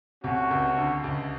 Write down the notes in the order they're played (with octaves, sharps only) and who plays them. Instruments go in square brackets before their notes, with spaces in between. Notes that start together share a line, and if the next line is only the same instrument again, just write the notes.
[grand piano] C2 C3 [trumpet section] A3 C#4 F#4
[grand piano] C#2 C#3
C#3
D2 D3
C#2 C#3